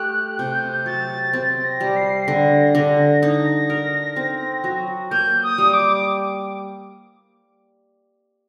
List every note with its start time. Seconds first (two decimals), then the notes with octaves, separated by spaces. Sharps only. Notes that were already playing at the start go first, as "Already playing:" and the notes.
Already playing: A3 G4 F#6
0.39 C3 G6
0.86 F#3 A6
1.33 C4 A6
1.64 A#6
1.80 G3
1.96 C7
2.28 D3 A#6
2.75 D3
3.22 D#4 A#6
3.70 A#4
4.16 C4
4.64 F#3
5.11 A#3 G6
5.43 D#6
5.58 G3
5.73 D6